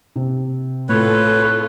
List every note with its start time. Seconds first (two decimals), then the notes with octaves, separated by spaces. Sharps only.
0.16 C3
0.89 A2 C4 F4 A4 B4 C#5